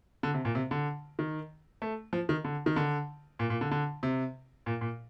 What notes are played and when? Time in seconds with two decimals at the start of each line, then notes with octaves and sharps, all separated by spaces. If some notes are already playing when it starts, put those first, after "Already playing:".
0.23 D3
0.34 C3
0.45 A#2
0.55 C3
0.71 D3
1.19 D#3
1.82 A3
2.13 F3
2.29 D#3
2.44 D3
2.66 D#3
2.76 D3
3.39 A#2
3.50 A#2
3.61 D3
3.71 D3
4.03 C3
4.66 A#2
4.81 A#2